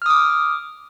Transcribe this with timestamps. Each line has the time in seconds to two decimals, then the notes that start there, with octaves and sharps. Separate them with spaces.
0.02 F6
0.06 D#6
0.10 D6